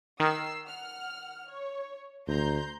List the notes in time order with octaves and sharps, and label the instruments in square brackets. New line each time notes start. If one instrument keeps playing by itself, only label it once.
[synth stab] D#3 [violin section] E6 C7
[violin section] F#5 F6
C#5
[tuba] D2 [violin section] A#5 C6 G6